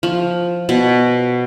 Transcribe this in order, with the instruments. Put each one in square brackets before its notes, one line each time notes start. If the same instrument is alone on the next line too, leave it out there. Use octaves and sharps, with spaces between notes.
[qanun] F3
B2